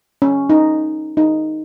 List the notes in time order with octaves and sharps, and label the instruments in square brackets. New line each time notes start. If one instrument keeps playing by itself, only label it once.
[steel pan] C#4
D#4
D#4